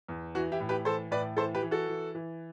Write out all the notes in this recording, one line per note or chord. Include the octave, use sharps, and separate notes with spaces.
E2
E3 F#4
E4 G4
A2
G4 B4
E3 A4 C5
A2 B4 D5
E3 A4 C5
G4 B4
E3
F#4 A4
E3
E3